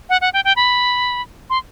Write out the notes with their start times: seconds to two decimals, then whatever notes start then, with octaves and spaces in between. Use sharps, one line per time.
0.10 F#5
0.21 F#5
0.33 G5
0.45 G5
0.56 B5
1.50 C6